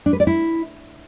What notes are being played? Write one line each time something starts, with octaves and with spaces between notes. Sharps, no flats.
D4
B4
D5
E4